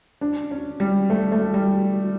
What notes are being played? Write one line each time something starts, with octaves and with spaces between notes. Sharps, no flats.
D4
C#4
G3
A3
A3
G3